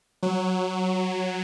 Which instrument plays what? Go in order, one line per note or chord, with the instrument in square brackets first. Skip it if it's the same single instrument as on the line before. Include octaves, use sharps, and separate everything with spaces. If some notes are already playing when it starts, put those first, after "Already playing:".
[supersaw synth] F#3